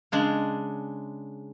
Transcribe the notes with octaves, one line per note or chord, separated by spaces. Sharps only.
C#3 G#3 D4